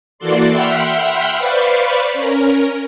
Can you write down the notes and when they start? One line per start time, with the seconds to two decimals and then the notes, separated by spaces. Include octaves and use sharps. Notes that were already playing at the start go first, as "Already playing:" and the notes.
0.18 E3 A#3 F#4 A4 D5 C6
0.50 E5 F#5 G5 B5 C6 F6
1.38 B4 C5 D5 F5 B5 C#6
2.13 C#4 A#4